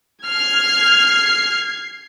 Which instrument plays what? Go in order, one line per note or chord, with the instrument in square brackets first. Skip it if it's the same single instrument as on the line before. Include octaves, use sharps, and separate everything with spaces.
[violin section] F6 [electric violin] G#6 C7